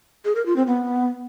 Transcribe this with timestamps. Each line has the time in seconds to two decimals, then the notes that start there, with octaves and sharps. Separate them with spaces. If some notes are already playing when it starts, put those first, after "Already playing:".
0.25 G#4
0.35 A#4
0.46 F4
0.56 C4
0.67 B3